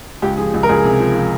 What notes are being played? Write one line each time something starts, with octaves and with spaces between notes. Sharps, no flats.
C#2 G4
F3 G#4
C#2
A#4
C#2 G#4
C3 G#4
F3
F3